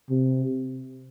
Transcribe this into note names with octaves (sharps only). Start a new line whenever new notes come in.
C3